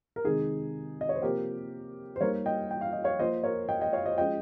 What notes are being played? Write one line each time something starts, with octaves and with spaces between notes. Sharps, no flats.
A#4
C3 D#3 G#3 D#4 G#4
D#5
C#5
C5
C3 F3 A#3 G4 A#4
C5
G3 A#3 D#4 A#4 C#5
D#5 G5
G5
F5
D#5
C#5 F5
F3 A#3 F4 C5 D#5
A#4 C#5
D#5 G5
D#5 G5
C#5 F5
C5 D#5
F3 G#3 C#4 D#5 G5